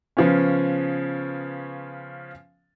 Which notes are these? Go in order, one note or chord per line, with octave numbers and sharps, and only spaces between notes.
C#3 F3 B3 C#4